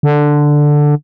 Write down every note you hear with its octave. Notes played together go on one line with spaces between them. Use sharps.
D3